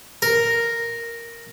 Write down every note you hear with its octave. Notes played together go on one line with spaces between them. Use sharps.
A#4